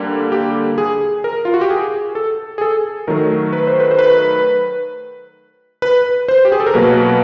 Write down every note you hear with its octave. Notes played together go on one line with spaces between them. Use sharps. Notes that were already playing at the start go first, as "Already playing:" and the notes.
Already playing: D3 G3 A#3
G4
G#4
A#4
F4
F#4
G4
G#4
A4
G#4
A4
D#3 F#3 A3 A#4
B4
C5
B4
C5
B4
B4
C5
G4
G#4
A4
A#4
B2 F#3 A#3 B4